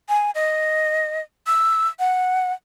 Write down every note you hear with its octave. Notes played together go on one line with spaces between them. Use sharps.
G#5
D#5
E6
F#5